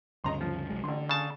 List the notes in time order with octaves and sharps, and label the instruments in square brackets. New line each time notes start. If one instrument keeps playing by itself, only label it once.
[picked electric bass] D2 G2 C#3 [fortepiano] D#5 A#5 C6
[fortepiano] F3
[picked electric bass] C2 F#3 G#3
[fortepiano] A1 C6 [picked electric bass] D3
[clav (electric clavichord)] C#3 A5